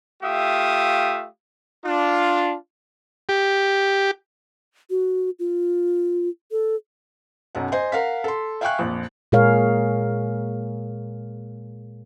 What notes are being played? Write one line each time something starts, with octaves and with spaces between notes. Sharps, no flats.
A3 F4 G4 E5 F5 D#6
D4 F4
G4
F#4
F4
A4
B1 F#2 F#5
C5 D#5 G#5 C6
A#4 F5 F#5 B6
A4 C6
E5 F5 G5 G#5 C#6 F#6
A#1 F2
A#2 G#3 G#4 A#4 C#5 F5